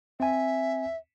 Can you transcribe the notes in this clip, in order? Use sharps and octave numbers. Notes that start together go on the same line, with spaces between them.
C4 E5 G#5